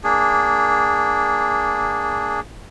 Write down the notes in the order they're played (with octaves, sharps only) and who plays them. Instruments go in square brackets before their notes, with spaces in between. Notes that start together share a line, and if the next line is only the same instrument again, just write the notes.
[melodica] A#3 D4 G#4